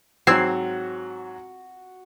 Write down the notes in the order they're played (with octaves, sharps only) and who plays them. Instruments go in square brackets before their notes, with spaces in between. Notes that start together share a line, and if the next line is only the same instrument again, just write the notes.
[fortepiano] G#2 F#3 [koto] C4 [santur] F#4 [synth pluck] E6 G#6 C7